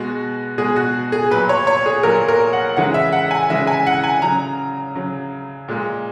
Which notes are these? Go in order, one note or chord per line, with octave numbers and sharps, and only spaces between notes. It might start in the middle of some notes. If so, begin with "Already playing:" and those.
Already playing: B2 G#3 F#4
B2 G#3 G#4
F#4
G#4
A#2 F#3 B4
C#5
C#5
G#4
A#2 F#3 A#4
A#4
F#5
C#3 E3 G#3 F#5
E5
F#5
G#5
C#3 E3 G#3 E5
G#5
F#5
G#5
C#3 F#3 A#5
C#3 F#3
A#2 G#3